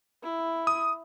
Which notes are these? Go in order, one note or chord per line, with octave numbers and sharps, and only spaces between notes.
E4
D#6